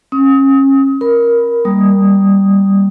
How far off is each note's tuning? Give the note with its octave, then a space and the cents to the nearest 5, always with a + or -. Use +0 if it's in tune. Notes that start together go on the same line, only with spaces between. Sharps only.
C#4 -30 D#6 +30
A#4 +10 B5 +0
G3 +0 A#3 +0 D#6 +0